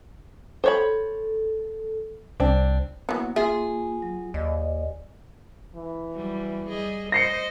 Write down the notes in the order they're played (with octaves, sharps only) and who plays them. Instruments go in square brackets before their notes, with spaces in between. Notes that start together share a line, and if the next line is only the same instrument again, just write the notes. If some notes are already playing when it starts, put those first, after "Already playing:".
[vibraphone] A4 [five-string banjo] C5 C#5 B5
[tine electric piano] C2 [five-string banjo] C4 D4
[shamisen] E3 F#3 [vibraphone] A#3 [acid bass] B3
[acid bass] F4 [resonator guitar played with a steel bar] G#4 [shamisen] E5
[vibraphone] F#3
[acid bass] D#2 [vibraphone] D5 D#5
[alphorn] E3
[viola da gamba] F#3 G3
G3 G#4 D#5
[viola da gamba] C5 D#5 [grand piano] A#6 C7 C#7